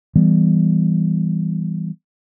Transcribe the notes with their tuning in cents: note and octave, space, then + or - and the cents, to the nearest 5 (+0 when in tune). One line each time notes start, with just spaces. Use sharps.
E3 +0 G3 +0 B3 +0